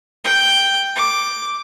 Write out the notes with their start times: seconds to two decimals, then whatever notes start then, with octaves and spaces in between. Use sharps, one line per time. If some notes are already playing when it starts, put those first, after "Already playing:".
0.25 G5
0.96 D6